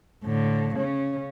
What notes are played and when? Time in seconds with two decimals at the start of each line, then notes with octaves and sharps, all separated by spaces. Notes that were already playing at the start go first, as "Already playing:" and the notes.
0.24 A2 D3
0.75 C#3 C#4